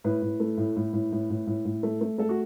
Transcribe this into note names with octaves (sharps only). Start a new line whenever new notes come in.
A2 B4
A2
A3
A2
A2
A2
A2
A2
A2
A2
A3
A3
A3 A4
F#4